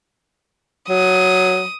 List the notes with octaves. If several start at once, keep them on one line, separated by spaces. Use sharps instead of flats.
F#3 D#6